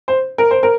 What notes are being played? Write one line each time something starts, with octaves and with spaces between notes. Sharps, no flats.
C5
A#4
C5
A#4